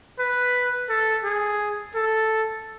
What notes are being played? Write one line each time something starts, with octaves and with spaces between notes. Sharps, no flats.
B4
A4
G#4
A4